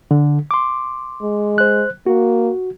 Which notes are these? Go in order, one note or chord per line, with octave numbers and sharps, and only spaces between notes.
D3
C6 D6
G#3
C5 F#6
A#3 F#4